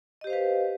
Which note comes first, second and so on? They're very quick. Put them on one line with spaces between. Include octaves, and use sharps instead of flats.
D#5 G4 C5 F5 B4